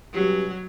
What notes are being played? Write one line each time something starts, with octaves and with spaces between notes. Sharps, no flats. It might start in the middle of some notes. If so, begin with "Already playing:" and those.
B2 F#3 G3 C#4 G4